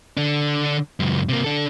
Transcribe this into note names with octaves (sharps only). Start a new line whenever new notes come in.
D3 D4
C#2 F#2
C3 A#3
D4 A4